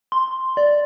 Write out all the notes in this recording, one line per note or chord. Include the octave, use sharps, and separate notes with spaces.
C6
D5